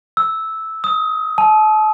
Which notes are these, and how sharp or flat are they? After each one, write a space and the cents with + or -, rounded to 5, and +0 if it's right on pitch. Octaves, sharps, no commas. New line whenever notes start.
E6 -10
D#6 +20
A5 -35